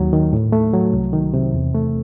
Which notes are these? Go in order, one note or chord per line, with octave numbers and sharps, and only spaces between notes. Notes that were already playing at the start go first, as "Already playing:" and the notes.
Already playing: D#2 F#3
D#3
A2
A3
F#3
C2
D#3
C3
E2
A3